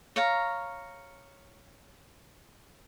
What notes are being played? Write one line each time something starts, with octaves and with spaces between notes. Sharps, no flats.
C#5 F5 A#5